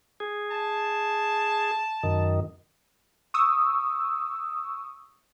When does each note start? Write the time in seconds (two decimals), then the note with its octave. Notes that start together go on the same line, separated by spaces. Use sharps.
0.20 G#4
0.51 A5
2.03 F#2 D#3
3.34 C#6 D#6 E6